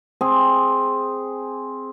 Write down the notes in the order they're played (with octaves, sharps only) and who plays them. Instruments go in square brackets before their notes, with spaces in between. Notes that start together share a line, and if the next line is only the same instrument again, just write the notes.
[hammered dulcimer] C4 G#4